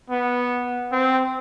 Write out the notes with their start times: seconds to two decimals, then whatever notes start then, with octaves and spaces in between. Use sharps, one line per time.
0.10 B3
0.92 C4